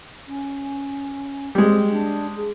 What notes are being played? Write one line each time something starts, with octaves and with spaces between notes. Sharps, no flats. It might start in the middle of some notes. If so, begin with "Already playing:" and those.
C#4
G3 G#3 C4
D4
G#4